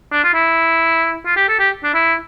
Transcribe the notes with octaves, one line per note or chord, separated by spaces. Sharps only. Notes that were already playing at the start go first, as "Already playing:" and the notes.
D4
F4
E4
F4
G4
A4
G4
D4
E4